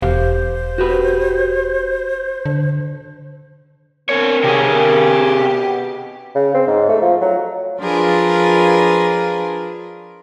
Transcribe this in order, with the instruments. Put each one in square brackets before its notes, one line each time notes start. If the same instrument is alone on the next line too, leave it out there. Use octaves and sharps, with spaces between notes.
[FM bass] E1 [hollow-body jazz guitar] G4 F5 [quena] C5
[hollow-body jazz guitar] F#4 G4 B4
[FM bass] D3
[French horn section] B3 D4 A#4 [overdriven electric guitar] C4 C#5
[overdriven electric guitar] C3 G#4 [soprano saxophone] G4
[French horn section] B2
[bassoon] C#3
C4
G#2
A3
F3
F#3
[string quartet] F3 D4 F4 G#4 A#4 B4